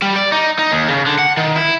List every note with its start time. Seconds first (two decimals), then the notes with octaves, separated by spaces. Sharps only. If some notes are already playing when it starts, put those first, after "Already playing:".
0.02 G3
0.16 D5
0.32 D#4
0.59 D#4
0.72 D#2
0.90 C#3
1.06 D3
1.19 F#5
1.37 D#3
1.56 E4